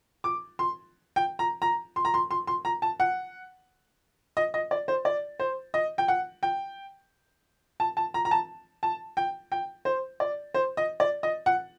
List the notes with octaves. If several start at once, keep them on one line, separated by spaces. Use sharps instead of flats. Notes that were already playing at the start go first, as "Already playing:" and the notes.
D6
C6
G5
A#5
A#5
C6
A#5
C6
C6
C6
A#5
A5
F#5
D#5
D#5
D5
C5
D5
C5
D#5
G5
F#5
G5
A5
A5
A#5
A#5
A5
A5
G5
G5
C5
D5
C5
D#5
D5
D#5
F#5